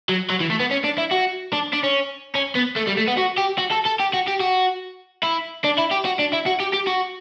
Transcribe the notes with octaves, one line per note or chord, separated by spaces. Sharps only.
F#3
F#3
E3
A3
B3
C#4
D4
E4
F#4
D4
D4
C#4
C#4
B3
A3
G3
A3
B3
F#4
G4
F#4
A4
A4
G4
F#4
G4
F#4
E4
D4
E4
G4
F#4
D4
E4
F#4
G4
G4
F#4